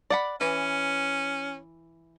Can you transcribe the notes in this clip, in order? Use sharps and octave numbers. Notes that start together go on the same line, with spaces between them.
D5 F#5 B5
E3 C#4